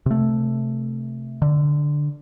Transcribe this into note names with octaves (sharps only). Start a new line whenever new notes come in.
C3 A3
D3